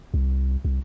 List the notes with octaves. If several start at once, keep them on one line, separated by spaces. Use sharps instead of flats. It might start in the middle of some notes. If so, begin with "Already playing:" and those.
C2
C2